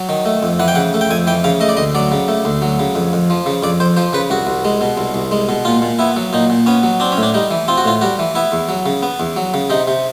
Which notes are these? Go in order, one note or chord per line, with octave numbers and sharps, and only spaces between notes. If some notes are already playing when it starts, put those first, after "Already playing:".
Already playing: F#3
D#3
A3
F2
E3 F#5
G5
C#3 F#5
A3
G5
F2 G#5
E3 G5
C#3 F5
A3 D#5
D5
D2 D#5
F#3 D5
C#3
A3
D2
F#3
C#3
F2
F2
F3
C#3
F2 D5
F2 C5
F3 C5
C#3 B4
C2 F#4
C2
G#3
B2
C2
C2
G#3
B2
A#2 F4
A#2
B3 E4
F#3
A#2 D#4
A#2
B3 C#4
F#3
C4 D4
C#4
A2
D4
G3 D#4
E3
C4 F4
F#4
A2 F4
G3 F#4
E3
B3 E4
E2
F#3
C#3
B3
E2
F#3
C#3
C3 D#4
C3